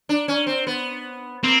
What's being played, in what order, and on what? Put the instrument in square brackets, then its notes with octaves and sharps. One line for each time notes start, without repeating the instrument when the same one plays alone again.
[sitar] D4
C#4
C4
B3
[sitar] A#3 [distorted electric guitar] C4